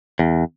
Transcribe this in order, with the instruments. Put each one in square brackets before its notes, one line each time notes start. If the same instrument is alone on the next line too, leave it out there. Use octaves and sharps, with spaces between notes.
[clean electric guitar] E2